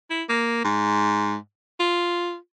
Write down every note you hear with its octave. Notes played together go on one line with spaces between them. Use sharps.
E4
A#3
G#2
F4